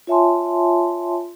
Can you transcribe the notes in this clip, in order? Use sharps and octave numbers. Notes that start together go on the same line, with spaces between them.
F4 C#5 E5 G#5 A5 C6